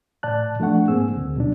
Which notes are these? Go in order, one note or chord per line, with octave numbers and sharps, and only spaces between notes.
A2 D5 A5 F#6
F3 A3 D4 F#5 C#6
G#2 A#3 C4 G#4 E6
D2
B2 F#3 D4